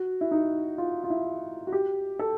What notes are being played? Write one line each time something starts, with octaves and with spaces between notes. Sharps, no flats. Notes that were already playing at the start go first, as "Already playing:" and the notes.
Already playing: F#4
E4
D#4
F4
F4
E4
F#4
G4
A4